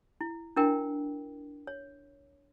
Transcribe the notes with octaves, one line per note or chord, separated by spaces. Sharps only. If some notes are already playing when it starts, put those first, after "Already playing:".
E4
D4 E4 A#4 G5
C#5